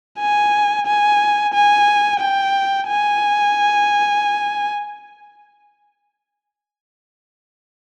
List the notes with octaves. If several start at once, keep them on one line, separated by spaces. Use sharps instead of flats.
G#5
G#5
G#5
G5
G#5